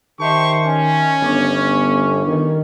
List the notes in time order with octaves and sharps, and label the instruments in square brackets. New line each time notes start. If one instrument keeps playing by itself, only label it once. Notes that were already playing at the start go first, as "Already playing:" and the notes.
[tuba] D#3 [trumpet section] G4 C5 C#6 [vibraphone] D#5 E5 A5
[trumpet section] C#4 [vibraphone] G#5
[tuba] G1 [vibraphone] B3 D4 C#6
[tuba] D#3